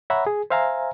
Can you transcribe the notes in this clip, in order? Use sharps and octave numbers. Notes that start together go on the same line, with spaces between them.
C#5 E5 F#5 A#5 B5
G#4
C5 E5 F5 G#5 A#5